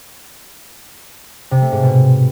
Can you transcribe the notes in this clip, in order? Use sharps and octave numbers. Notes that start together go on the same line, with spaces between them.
C3
A3
G#2
B2